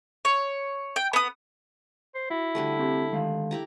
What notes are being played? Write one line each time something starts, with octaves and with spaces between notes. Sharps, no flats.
C#5
G5
B3 D#6
C5
E4 F#4
D3 G3 A3
C4 G4
D#3 G#3 F5
E4 G4 A#5